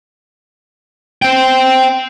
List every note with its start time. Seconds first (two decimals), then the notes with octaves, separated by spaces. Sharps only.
1.22 C5 G5